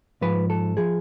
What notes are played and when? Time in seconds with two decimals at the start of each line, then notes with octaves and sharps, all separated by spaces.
0.21 G#2 F3 B4
0.50 A4
0.77 F3 G#4